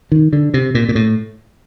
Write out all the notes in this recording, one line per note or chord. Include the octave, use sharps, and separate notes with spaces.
D#3
D3
C3
A#2
A#2
A2